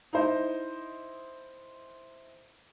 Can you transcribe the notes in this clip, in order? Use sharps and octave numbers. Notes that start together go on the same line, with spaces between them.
D#4 E4 C5 D#5